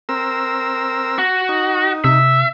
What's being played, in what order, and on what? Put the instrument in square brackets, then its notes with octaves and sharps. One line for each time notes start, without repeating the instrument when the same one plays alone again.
[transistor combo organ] C4 A#4 E6
[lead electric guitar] F#4
[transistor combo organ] D#4
[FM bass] C3 [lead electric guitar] E5